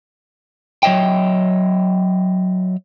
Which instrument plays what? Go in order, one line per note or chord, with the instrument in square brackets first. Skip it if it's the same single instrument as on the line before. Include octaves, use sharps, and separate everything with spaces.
[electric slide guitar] F#3 C#5 D#5 E5 G5